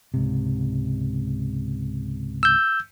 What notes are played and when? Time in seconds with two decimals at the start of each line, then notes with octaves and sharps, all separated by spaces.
0.14 C#2 G#2 C3
2.43 E6 G6